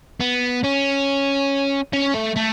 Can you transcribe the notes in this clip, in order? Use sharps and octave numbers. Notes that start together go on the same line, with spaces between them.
B3
C#4
C#4
A3
A3